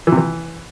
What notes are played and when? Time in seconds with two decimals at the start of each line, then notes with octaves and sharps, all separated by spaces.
0.07 E3
0.12 C3
0.17 E3